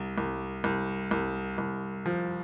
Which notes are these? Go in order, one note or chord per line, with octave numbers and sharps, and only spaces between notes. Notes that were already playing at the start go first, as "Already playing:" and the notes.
Already playing: C2
C2
C2
C2
C2
F3